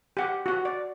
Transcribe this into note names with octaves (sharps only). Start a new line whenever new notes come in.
G4 F#5
F#4 F#5
D5